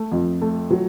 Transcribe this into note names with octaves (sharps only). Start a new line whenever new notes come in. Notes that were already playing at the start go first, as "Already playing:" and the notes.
Already playing: A3
F2
A3
F#3